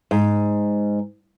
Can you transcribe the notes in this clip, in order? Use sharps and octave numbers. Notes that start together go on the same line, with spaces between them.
G#2